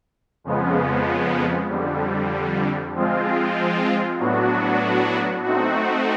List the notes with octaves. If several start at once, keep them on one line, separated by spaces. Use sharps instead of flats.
F2 C#3 F3 G#3 B3
F2 D3 G3
F3 G#3 C4 F4
A2 F#3 B3 D4 F#4
A3 C4 D#4 F#4